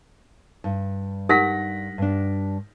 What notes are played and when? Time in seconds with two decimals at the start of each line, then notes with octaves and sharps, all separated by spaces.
0.64 G2
1.29 D#4 G4 A#4 F#5 A#6 B6
1.98 G2 D4